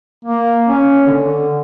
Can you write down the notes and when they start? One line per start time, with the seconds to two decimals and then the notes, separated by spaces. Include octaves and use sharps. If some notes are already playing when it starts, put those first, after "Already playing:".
0.25 A#3
0.68 C#4
1.07 D3